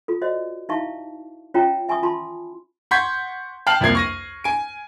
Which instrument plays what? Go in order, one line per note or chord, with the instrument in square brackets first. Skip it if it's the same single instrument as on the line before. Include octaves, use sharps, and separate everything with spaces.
[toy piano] F4 A4
F#4 C5 D5 D#5
D#4 E4 E5 F5 A5 C#6
C#4 F4 C#5 E5 G5 A#5
E5 G#5 B5 C#6 D#6
F4 A5 B5 C6
[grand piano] F#5 C6 C#6 G6 G#6 B6
G5 A5 F6 C7 F7 F#7
C2 F2 A#3 G#6 C7
C#6 A#6 D#7
G#5 D7